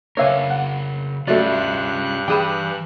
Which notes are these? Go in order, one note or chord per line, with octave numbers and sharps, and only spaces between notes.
C#3 D4 A#4 B4 C#5 E5 F5 G#5
F#5
G2 F#3 A3 C#4 F4 D5 E5 F#6
E3 D4 G#4 G5 B5 D#6 E6